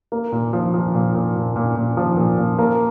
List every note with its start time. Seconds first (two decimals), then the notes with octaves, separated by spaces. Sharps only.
0.12 A#3
0.32 A#2
0.53 F3
0.74 F3
0.95 A#2
1.15 A#2
1.36 A#2
1.56 A#2
1.76 A#2
1.97 F3
2.17 A#2
2.38 A#2
2.58 A#3